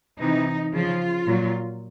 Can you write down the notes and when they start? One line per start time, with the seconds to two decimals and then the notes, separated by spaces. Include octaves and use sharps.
0.20 C3 E3 D#4
0.73 C#3 F3 F4
1.27 A#2 F#3